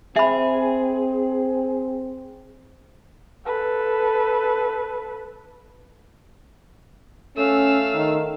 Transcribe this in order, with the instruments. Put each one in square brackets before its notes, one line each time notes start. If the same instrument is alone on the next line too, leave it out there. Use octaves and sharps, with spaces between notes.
[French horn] C4 [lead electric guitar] G#4 [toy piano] E5 B5
[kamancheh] A4 B4
[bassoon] A3 [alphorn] C#4 [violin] F5 E6
[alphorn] D#3